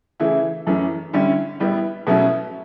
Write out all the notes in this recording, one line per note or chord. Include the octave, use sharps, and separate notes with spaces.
C#3 E3 A3 E4
F#2 E3 A3 C#4
D3 G3 C#4 E4
A2 G3 B3 E4
B2 F#3 A3 C#4 E4